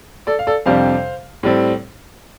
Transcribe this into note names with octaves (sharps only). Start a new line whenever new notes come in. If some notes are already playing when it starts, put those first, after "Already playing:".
A4 D5
F5
A4 D5
F2 C3 G3 D4 C5 F5
A2 G3 C4